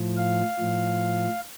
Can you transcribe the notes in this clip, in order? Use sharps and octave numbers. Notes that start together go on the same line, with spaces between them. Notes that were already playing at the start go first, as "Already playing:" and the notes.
Already playing: A2 F3
F5
A2 F3